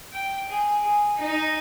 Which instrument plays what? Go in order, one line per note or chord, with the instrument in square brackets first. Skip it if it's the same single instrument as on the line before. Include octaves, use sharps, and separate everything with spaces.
[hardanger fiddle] G5
G#4
G#4
D#4